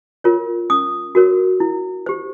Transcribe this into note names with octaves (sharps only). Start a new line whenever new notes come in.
F4 A#4 C#5
C#4 D#6
F#4 A#4 C#5
E4
G4 C5